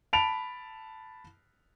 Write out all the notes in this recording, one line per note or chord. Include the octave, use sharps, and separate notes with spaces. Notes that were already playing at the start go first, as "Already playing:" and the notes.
A5 B5 D7 F7